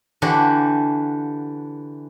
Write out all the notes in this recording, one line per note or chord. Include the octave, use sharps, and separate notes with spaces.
D3 E3 F#4 G4